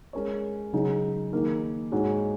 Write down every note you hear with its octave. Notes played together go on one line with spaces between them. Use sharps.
G#3 C#4 A#4 C#5
C#3 F#3 D#4 G#4
D#3 A#3 D#4 G#4
G#2 G#3 F#4 C#5